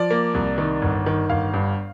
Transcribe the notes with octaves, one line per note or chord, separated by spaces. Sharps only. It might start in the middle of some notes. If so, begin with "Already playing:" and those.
Already playing: F3 D5
A#3
C2
D#3
G1
D#3
G1 F5
G2